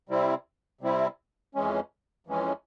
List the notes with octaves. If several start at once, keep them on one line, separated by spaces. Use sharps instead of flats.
C3 G3 C4 E4
C3 G3 C4 E4
F2 E3 G#3 C#4
F2 E3 G#3 C#4